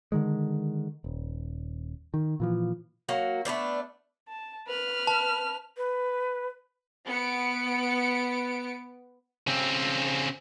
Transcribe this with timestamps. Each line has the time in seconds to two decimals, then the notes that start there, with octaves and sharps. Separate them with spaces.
0.12 D3 D#3 G#3
1.04 D#1
2.14 D#3
2.40 A#2 E3 F3
3.09 F#3 A#3 F#4
3.45 A3 B3 D4 C5
4.28 A5
4.67 B4 F6
5.07 A5
5.77 B4
7.06 B3 C#7 D7
9.47 C#3 C4